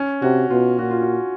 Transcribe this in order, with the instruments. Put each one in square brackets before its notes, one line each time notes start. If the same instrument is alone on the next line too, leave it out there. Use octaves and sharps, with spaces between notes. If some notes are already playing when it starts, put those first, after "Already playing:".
Already playing: [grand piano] C#4
[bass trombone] C3 [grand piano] F#4
[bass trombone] B2 [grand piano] F4
[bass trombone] A#2 [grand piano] F#4
[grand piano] F4
F#4